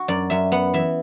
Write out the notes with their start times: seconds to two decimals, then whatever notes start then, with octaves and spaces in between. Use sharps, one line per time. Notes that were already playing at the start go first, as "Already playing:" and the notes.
Already playing: F#4
0.08 F#2 D5
0.30 F#2 E5
0.52 B3 F#5
0.74 E3 E5